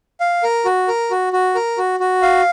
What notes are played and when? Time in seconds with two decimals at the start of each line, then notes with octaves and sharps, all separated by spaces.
0.20 F5
0.43 A#4
0.65 F#4
0.88 A#4
1.11 F#4
1.33 F#4
1.55 A#4
1.78 F#4
2.00 F#4
2.22 F5